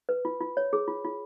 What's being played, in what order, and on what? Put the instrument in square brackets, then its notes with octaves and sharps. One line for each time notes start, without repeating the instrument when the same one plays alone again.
[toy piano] B4
F4
F4
C#5
G#4
F4
F4